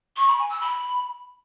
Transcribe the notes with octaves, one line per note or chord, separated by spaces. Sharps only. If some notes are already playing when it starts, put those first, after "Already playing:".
C#6
B5
G#5
E6
B5